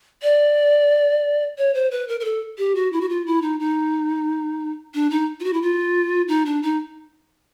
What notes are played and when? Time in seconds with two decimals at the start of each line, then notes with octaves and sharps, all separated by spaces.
0.23 D5
1.58 C#5
1.74 C5
1.91 B4
2.08 A#4
2.20 A#4
2.25 A4
2.58 G4
2.75 F#4
2.92 E4
3.01 F#4
3.09 F4
3.26 E4
3.42 D#4
3.60 D#4
4.94 D4
5.10 D#4
5.40 F4
5.44 F#4
5.53 E4
5.62 F4
6.28 D#4
6.46 D4
6.62 D#4